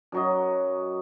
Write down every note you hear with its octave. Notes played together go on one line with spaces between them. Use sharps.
F#2 F#3 D#5